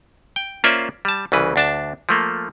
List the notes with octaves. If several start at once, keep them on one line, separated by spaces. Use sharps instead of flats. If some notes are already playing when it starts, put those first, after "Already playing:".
G5
A#3 C#4 F4 C5 D5 E5
G3 A5
C2 C#3 E3 B4
D2 D4 A5
F3 A3 A#3